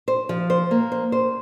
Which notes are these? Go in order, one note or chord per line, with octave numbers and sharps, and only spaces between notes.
C5
F3
C5
A#3
C5
C5